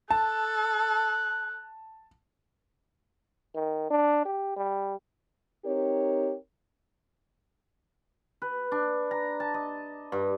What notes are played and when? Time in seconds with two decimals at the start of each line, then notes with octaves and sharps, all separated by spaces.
0.11 A4 A5 F#6
3.55 D#3
3.90 D4
4.25 G4
4.57 G3
5.66 C4 D#4 G4 A#4 C#5
8.42 B4
8.72 D4
9.11 A#5
9.40 A5
9.54 D#5
10.12 G2